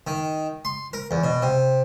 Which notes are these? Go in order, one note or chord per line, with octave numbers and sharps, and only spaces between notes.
D#3
C6
A#4
E2
B2
C3